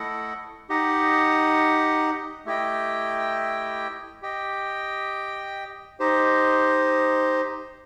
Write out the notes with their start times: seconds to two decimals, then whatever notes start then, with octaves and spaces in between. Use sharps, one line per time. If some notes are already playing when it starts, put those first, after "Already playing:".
Already playing: A3 E4 A4 D#5 F#5
0.69 D#4 G4 D#5 F#5
2.45 A3 E4 G4 D#5 G5
4.22 G4 D#5 G5
6.00 D#4 G4 C5 D#5